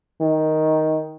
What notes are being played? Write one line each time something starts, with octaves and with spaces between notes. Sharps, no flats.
D#3